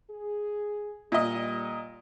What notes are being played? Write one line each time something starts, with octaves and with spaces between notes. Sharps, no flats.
G#4
A#2 D3 G3 D#5